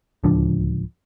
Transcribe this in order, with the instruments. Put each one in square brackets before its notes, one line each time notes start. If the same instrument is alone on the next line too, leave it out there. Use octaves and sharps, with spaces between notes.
[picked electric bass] D1 C#2 F3 D4